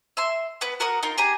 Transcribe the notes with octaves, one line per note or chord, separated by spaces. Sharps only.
E5 C6
B3 B4
F#4 A#4 F#5 D#6
D#4 F4 A#4
G4 G#4 G#5 A#5